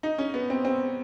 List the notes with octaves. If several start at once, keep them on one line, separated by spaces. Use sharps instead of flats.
D#4
C#4
B3
C4
C4